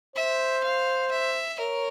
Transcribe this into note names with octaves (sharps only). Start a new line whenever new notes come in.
C5 E5
F5
E5
A#4 C#5